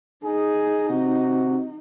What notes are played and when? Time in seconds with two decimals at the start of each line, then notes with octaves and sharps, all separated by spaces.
0.24 D#4 G#4
0.90 C3 F#4